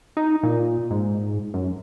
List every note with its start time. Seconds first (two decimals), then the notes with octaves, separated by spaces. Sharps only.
0.17 D#4
0.43 A#2
0.91 G#2
1.54 F#2